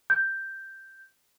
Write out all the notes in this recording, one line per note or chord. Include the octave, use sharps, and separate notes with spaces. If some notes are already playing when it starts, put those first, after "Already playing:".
G6